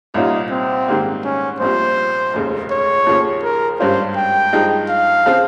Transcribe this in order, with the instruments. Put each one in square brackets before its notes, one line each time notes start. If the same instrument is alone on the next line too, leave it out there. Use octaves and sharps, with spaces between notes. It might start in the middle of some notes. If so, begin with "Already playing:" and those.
[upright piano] C2 A#2 G3 C#4 F4 [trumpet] D#4
[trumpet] C4
[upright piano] G#2 D#3 G3 A#3
[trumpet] C#4
[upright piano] A#1 A#2 G3 C4 [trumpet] C5
[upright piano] F1 D#2 C#3 G#3
[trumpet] C#5
[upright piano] D#2 C#3 F3
[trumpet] A#4
[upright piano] G#1 G2 G3 C#4 F4 [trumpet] C5
[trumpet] G5
[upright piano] G2 F3 G#3 D#4
[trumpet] F5
[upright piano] C#3 F3 C4 F4